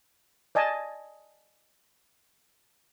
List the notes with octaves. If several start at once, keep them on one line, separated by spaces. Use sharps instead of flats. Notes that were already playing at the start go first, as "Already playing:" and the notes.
D5 D#5 G#5 A5